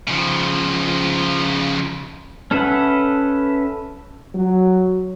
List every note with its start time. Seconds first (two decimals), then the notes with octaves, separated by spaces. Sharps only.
0.08 C#3 F3
2.51 C#4 A4 B4 E5 F#5
4.35 F#3